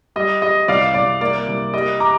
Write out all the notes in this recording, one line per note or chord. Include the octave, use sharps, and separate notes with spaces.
G3 D#5
G3 D#5
C2 D5 F5
C2 D5
A#3 D5
C2
G3 D#5
A#5 D6